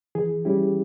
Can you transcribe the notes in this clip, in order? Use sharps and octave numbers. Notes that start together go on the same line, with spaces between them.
E3 G#4
G3 C#4 E4 G4